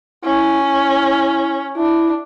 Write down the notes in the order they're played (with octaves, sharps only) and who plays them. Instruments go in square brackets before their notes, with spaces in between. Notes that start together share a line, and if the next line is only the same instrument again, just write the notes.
[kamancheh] C#4 [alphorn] E4
[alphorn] E4
[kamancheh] D4 [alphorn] E4